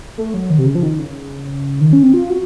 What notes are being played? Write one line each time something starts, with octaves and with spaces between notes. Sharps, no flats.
A3
F#3
D#3
C3
C#3
F3
D#3
C#3
D#3
C#4
C4
F4
F#4